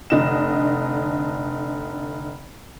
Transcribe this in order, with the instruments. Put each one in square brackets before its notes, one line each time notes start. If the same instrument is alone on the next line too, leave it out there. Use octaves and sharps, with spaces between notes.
[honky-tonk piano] F1 D3 D#5 E7